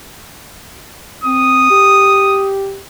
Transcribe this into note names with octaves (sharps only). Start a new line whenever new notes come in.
C4 D#6
G4